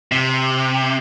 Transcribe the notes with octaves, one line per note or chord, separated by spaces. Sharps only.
C3